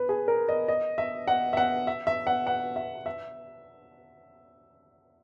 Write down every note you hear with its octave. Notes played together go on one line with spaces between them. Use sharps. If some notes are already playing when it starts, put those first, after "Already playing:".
Already playing: B4
G#4
A#4
D#5
D#5
E5
F#5
E5
F#5
E5
E5
F#5
F#5
E5
E5